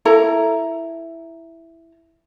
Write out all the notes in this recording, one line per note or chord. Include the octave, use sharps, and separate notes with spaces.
E4 A4 A#5